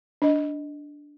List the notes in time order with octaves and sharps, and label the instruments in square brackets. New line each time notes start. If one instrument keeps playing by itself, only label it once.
[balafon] D4 D#5